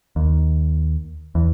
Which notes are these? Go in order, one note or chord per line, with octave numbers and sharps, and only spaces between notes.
D#2
E2